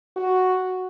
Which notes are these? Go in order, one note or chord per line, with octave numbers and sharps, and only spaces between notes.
F#4